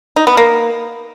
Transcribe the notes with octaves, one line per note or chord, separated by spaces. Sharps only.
D#4
B3
A#3